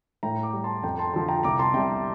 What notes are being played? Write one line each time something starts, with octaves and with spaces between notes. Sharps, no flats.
A2 G5 A#5
A#5 D6
G3
A5 C6
F2 G5 A#5
A5 C6
D3 F3 A5 C6
G5 A#5
C2 A#5 D6
A5 C6
C3 G3 G5 A#5